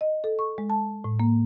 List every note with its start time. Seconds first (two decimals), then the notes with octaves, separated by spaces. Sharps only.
0.01 D#5
0.24 A4
0.39 C#6
0.58 G#3
0.70 A5
1.04 A2
1.20 A#3